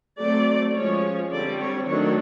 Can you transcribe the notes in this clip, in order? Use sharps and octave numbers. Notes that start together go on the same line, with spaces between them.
F#3 A3 C4 D5
F3 G#3 C#4 C#5
D3 G3 C4 D5
C#5
D#3 F#3 A3 D4 C#5